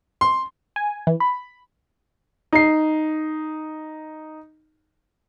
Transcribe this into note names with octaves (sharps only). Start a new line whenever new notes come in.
C6
G#5
E3
B5
D#4 C7